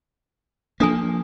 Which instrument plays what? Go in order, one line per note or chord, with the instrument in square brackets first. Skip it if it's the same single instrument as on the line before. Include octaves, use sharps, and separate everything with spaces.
[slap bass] F3 A#3 [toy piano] D4 A4 G#5